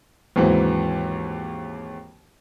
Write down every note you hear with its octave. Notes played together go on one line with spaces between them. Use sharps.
D#2 G#2 E3 F#3 C4